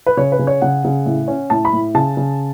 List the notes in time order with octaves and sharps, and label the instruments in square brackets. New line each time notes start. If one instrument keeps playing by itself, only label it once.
[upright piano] B4
C#3 C#5
B4
C#3
C#5
C#3 F#5
C#3
A2
C#4
A2 A5
B5
A2
C#3 A5
C#3